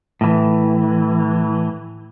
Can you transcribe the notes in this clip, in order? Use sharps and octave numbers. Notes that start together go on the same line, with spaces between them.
A2 E3